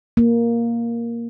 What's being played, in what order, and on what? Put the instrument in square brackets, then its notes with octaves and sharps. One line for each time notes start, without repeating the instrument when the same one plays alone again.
[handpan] A#3